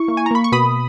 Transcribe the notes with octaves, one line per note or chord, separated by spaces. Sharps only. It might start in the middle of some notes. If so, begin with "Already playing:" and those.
Already playing: E4 C#6
A#3
G#5
A#5
A#3 B5
C#6
B2 B5 D#6